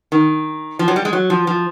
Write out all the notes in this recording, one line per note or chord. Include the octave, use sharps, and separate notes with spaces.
D#3
F3
F#3
G3
G#3
F#3
F3
F3